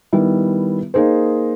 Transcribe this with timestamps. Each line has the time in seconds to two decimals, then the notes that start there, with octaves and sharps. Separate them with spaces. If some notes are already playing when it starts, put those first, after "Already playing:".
0.13 D#3 G3 B3 E4
0.94 A#3 D#4 G#4 C5